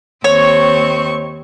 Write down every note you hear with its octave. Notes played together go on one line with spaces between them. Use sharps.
D#2 C4 C#5 C#6